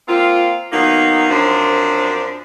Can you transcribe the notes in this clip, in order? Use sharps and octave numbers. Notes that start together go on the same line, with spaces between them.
A#3 C4 F4
D#3 F#3 A#3 B3 D#4
F#2 F3 C4 D4